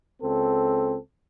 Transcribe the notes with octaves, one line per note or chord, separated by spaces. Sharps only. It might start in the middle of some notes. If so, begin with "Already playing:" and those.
C#2 C4 A4